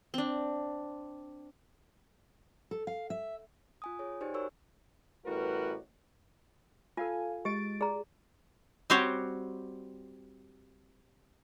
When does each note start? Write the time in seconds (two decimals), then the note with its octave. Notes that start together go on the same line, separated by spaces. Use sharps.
0.14 C4 D4
2.71 A4
2.87 F5
3.10 E5
3.82 F4 G#5 D#6
3.99 G#4 C#5
4.21 D#4 G4 C5 D5 G#5
4.34 F#4 A#4 C5 C#5 C#6 E6
5.26 A1 A2 G3 F#4 A#4 B4
6.97 F4 A4 F5 G#5
7.45 G#3 G4 A6 D7
7.81 G#4 D5 A#5
8.90 G3 C4 F#4 G4 C5 C#5